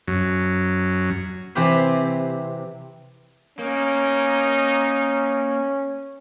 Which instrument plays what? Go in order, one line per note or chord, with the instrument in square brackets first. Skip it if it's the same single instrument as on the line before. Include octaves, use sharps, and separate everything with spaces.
[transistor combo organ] F#2
[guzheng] C3 E3 C4 G4 B4
[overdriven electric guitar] A#3 [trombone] C#4 [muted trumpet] D#4